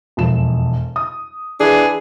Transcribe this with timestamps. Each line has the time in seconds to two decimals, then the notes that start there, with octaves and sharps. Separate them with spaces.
0.17 E1 F2 E7
0.96 D#6
1.60 E3 D4 G#4